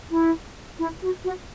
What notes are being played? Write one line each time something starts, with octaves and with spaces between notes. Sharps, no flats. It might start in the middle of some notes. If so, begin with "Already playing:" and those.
E4
E4
F#4
F#4